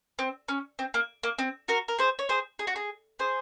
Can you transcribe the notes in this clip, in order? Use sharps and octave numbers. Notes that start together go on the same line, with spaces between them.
C4
C#4
C4
A#3
A#3
C4
F#4 A#4
A#4
G#4 C5
C#5
G#4 C5
G#4
F#4
G#4
G#4 C5